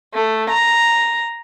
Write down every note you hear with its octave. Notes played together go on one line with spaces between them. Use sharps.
A3
A#5